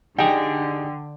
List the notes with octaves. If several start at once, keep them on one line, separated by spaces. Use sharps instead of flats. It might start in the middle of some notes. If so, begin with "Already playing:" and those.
D3 D#4 G4 G#4 G5